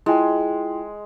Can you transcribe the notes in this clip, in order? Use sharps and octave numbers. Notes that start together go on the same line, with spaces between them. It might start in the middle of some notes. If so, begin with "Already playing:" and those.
G#3 E4 F4 G5